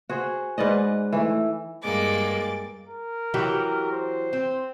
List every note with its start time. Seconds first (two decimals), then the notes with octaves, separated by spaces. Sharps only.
0.09 F#4 G#4 C5
0.58 G#2 B4 D5 D#5
1.13 E3 A3
1.82 G2 G#3 A#3 D6 A6
2.88 A#4
3.34 E3 F#3 G4
3.92 C5
4.33 C4